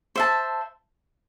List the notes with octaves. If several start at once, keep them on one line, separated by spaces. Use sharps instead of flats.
C5 E5 A5